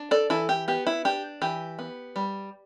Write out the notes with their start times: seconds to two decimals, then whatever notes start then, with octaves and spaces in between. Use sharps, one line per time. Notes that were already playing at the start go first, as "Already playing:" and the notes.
Already playing: D4
0.11 A4 D5
0.30 E3 E4 A4
0.49 G4
0.68 B3 G4
0.87 E4
1.05 D4 G4
1.42 E3 G4
1.79 B3
2.16 G3